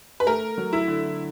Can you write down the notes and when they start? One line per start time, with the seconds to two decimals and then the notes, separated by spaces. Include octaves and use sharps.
0.20 B4
0.27 A3 A#4
0.58 F#3
0.73 E4
0.87 D3